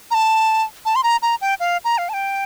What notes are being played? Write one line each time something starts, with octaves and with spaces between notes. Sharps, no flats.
A#5
A5
A5
C6
A#5
A#5
G5
F5
A#5
F5
A5
G5